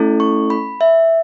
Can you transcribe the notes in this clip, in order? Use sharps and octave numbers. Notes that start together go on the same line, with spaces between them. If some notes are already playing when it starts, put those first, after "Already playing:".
Already playing: A3 C#4 E4 A4
C#6
B5
E5